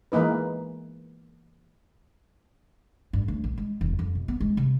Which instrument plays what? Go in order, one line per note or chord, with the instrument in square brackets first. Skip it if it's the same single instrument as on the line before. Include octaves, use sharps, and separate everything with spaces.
[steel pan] E3 G#3 A#3 D#4 B4
[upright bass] G2
D2
A#1
G#3
E1
F2
B2
B3
G#3
C3